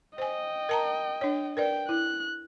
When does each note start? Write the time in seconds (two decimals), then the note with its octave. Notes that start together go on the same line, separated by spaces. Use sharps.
0.18 C5 D#5 G5 G#5
0.69 A#4 A5 A#5
1.21 D4 C#5
1.57 A#4 B4 D5 G5
1.89 E4 F#6